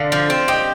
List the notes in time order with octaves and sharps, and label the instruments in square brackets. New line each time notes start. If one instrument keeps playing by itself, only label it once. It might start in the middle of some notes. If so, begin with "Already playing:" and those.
Already playing: [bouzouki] D3 [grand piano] D5 F5
[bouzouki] F3
C4
[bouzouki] G4 [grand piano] D#5 G5